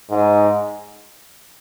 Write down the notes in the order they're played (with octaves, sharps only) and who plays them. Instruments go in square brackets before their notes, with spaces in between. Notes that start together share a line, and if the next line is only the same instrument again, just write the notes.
[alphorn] G#2